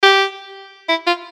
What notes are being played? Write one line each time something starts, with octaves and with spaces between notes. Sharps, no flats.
G4
E4
F4